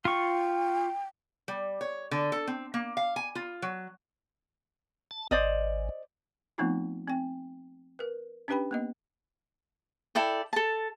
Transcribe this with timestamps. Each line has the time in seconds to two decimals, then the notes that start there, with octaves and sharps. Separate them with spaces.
0.05 F4 G5 C#6
1.48 G3
1.81 C#5
2.11 D3
2.32 A4
2.47 C4
2.74 A#3
2.97 F5
3.16 G#5
3.35 F4
3.62 F#3
5.11 A5
5.31 G#1 C5 D5 D#5
6.58 F3 A3 B3 C4 D#4 F4
7.08 C4 G5
7.99 A#4 B4
8.48 C#4 D4 G4 B4 G5 B5
8.71 A#3 B3 D#5
10.15 E4 A4 D5 G5
10.53 A4 A5